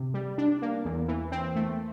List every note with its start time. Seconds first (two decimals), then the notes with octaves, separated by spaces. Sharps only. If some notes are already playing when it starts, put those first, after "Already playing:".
Already playing: C3
0.14 G3
0.38 D4
0.62 A#3
0.85 E2
1.08 E3
1.32 C4
1.56 A3